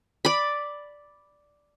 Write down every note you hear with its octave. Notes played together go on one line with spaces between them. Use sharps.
D5 B5